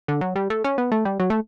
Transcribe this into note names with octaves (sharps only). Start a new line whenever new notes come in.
D3
F#3
G3
A3
C#4
B3
A3
G3
F#3
A3